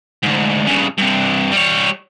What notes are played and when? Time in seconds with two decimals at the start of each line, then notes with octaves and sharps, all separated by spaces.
0.23 D2 G#2
0.67 G2 C#3
0.98 G2 C3
1.52 G3 C#5